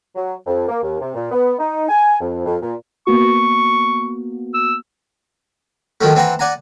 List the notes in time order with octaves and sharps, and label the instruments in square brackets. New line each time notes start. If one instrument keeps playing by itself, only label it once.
[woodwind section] F#3
F2
A#3
D#2
C3
A#2
B3
D#4
G#5
F2
F2
A#2
[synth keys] A#3 B3 F#4 [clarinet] C#6
[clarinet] E6
[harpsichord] D#3 F3 F#3 A3
E3 C4 F#5 A#5
D5 F#5 G#5 A#5